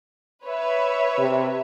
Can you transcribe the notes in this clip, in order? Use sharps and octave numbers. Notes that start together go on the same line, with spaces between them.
B4 C#5 E5
C3